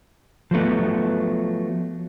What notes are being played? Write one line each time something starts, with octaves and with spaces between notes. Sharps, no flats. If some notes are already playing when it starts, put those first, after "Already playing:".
F3 F#3 A3 B3